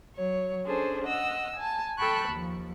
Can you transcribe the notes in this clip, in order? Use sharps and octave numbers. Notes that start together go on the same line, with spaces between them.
F#3 C#5
C#4 D4 G#4 A4 C5
D#5 F#5 E6
G#5 A5
A4 G5 A5 B5 C#6 F#6
D#2 F3